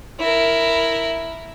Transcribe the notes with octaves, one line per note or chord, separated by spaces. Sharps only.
E4 A#4